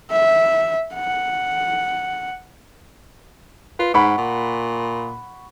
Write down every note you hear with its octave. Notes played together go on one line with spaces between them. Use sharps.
E5
F#5
F4 B4
G#2 F#5 B5 C#6
A#2